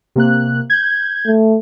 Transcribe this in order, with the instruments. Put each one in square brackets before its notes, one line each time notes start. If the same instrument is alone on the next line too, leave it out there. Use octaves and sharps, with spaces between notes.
[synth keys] C3 A#3 F#6
G6 G#6
[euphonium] A3